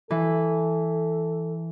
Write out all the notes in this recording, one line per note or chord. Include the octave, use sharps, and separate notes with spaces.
E3 A4